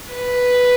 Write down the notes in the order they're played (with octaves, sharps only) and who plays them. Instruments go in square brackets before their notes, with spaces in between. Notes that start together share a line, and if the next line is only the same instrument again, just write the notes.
[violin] B4